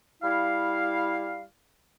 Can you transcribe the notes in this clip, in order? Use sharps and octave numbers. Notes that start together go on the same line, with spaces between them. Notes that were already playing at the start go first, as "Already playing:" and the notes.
G3 E4 F5